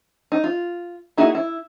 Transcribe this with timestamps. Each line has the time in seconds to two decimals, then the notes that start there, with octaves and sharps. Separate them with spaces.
0.32 D#4
0.44 F4
1.17 A#3 D#4 E4 F#4 G#4
1.35 E4